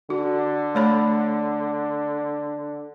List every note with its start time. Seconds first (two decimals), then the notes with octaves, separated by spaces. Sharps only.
0.10 D3 F#4
0.75 A3 C#5 B5